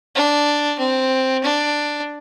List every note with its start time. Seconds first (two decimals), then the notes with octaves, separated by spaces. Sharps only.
0.15 D4
0.79 C4
1.44 D4